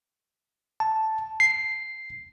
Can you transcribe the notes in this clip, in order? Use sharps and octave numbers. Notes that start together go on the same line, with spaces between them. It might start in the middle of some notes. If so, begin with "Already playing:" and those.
A5
C7